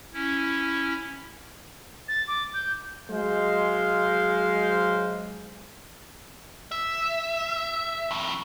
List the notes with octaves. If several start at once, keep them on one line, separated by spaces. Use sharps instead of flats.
C#4 E4
A6
D6
G6
F#3 G#3 C5 F5
E5
F2 A2